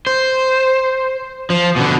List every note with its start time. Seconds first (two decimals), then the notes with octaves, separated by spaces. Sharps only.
0.07 C5
1.50 F3
1.76 B2 D3